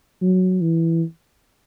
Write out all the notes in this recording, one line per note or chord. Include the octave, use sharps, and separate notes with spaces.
F#3
E3